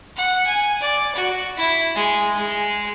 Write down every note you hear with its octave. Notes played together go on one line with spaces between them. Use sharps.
F#5
G#5
D5
F#4
E4
G#3
G#3